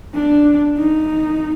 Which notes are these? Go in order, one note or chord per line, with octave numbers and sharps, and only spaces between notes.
D4
D#4